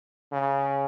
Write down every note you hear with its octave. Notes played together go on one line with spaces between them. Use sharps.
C#3